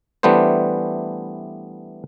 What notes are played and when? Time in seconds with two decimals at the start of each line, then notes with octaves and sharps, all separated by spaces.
0.23 E3 G3 A3 B3 D4 C5